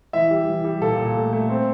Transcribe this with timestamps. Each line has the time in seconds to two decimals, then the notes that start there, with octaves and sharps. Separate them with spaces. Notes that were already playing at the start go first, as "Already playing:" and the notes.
0.13 E3 E5
0.31 G3
0.47 E3
0.65 G3
0.81 A#2 A4
0.99 A#2
1.16 A3
1.33 A3
1.49 C4